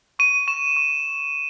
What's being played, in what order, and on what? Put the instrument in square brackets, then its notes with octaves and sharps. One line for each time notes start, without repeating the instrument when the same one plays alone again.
[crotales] C#6 D#7
C#6 E7
C#6